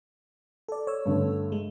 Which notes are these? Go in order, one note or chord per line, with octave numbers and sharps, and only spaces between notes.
A4 D5
C#5 E6
G2 D3 A3
G#3